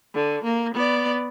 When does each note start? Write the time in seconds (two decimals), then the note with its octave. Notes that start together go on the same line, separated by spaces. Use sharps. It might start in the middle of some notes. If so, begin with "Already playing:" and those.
0.14 D3
0.44 A#3
0.74 B3 D5